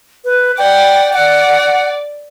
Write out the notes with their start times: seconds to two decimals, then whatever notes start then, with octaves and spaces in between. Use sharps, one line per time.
0.25 B4
0.58 D5 F#5 G5
1.13 D5 F#5